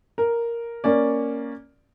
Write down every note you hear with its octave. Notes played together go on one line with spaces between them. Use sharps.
A#4
A#3 C#4 D5